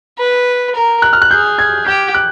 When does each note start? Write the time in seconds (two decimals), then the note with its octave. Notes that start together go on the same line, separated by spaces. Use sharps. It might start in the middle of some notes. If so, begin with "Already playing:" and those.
0.18 B4
0.75 A#4
1.02 F#6
1.13 F6
1.22 F#6
1.31 G#4 G6
1.59 G#6
1.86 G4 G6
2.14 F#6